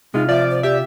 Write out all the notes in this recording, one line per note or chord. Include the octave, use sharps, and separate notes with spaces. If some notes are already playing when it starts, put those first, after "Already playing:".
C3 G#3 D#4 F4
F3 D5 E5
C5
G4 D5 E5